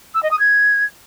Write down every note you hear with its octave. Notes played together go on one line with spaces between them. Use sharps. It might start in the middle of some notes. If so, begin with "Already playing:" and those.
E6
D#5
D#6
G#6